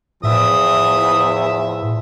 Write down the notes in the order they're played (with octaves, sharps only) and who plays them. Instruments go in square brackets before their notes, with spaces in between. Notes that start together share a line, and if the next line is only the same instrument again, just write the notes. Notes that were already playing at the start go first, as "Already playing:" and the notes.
[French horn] E2 [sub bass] A2 [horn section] F3 E5 [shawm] D#6